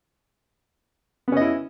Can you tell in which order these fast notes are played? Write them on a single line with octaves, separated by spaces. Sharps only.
B3 C#4 D#5 E4